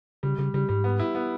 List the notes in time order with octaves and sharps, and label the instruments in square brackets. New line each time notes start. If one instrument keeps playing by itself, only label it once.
[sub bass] C#3 [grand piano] G3
[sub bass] C#3 [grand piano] G3
[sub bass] C#3 [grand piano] G3
[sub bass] G#2 [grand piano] G3
[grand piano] B3
E4
B3